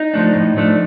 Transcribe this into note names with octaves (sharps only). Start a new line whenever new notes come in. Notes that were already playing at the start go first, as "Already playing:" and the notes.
Already playing: D#4
F3 A3 D4
A2
F3 A3 D4